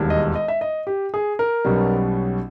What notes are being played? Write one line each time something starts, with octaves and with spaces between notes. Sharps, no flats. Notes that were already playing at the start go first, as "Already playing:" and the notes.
Already playing: E1 D#2 D#3 G3
D#5
D#5
E5
D#5
G4
G#4
A#4
B1 B2 G3 C#4